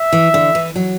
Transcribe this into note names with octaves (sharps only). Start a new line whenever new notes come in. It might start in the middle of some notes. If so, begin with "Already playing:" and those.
Already playing: E5
E3
D3
E3
F#3